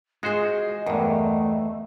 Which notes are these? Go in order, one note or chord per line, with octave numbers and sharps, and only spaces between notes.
G#3 F4 F#4 G#4 C5 D#5
E2 G2 A3 A#3